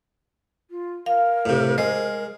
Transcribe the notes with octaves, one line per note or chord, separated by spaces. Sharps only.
F4
A#4 F5
A2 C3
G#3 C5